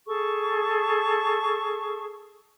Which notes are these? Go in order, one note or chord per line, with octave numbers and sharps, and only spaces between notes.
G#4 A4 A5 C#6